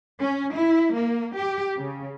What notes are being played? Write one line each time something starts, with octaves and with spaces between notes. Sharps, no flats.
C#4
E4
A#3
G4
C#3